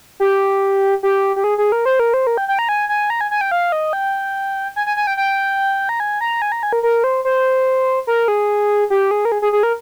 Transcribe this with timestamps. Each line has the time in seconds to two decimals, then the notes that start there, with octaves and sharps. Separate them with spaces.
0.20 G4
1.03 G4
1.36 G4
1.44 G#4
1.58 G#4
1.72 A#4
1.85 C5
1.99 A#4
2.14 C5
2.27 A#4
2.37 G5
2.48 G5
2.59 A#5
2.69 G#5
2.89 G#5
3.10 A#5
3.21 G#5
3.31 G#5
3.41 G5
3.51 F5
3.72 D#5
3.93 G5
4.76 G#5
4.86 G#5
4.97 G#5
5.07 G5
5.17 G5
5.89 A#5
6.00 G#5
6.21 A#5
6.42 G#5
6.52 A#5
6.63 G#5
6.73 A#4
6.83 A#4
7.04 C5
7.25 C5
8.07 A#4
8.28 G#4
8.90 G4
9.11 G#4
9.25 A#4
9.32 G#4
9.42 G#4
9.53 G#4
9.63 A#4